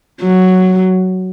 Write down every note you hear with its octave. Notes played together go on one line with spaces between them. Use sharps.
F#3